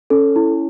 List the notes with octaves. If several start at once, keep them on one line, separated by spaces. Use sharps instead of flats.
C#4 A4
E4